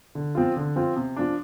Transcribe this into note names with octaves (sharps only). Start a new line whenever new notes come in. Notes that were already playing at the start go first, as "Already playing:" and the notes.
D3
F3 C4 F4
D3
F3 C4 F4
C3
F3 D4